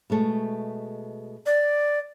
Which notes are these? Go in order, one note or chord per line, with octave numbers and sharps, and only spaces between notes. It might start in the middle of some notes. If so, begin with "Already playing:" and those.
B2 G#3 A3
D5